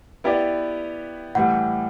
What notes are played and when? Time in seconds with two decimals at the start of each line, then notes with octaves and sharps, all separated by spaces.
0.24 B3 E4 G4 B4 D5
1.35 A2 E3 G3 F#5